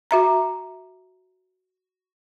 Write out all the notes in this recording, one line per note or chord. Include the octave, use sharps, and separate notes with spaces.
F#4 E5 A#5